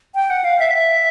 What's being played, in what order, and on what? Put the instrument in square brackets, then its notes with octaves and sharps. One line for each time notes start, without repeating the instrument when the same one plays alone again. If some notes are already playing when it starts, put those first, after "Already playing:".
[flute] G5
F#5
F5
E5
E5